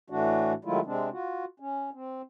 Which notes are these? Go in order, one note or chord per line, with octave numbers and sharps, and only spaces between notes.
A2 E3 A3 D4 F#4
D#3 F#3 G#3 A3 E4 F4
C3 G#3 C4 D4
F4 F#4
C#4
C4